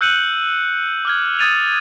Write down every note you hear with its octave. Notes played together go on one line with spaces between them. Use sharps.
E6 F#6 G6 C#7 D#7 F#7
D6 F6 G#6
D#6 G#6 A6 D#7 F7